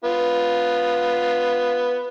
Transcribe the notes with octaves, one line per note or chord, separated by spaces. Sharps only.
B3 F4